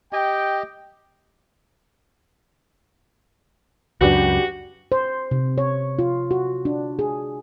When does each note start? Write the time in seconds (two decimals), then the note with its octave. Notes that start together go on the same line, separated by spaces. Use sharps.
0.13 G4 D#5 G5
4.01 C#2 F#2 D4 F#4 G4 B4
4.92 C5
5.31 C3
5.58 C#5
5.99 F4
6.31 F#4
6.65 D4
6.99 G#4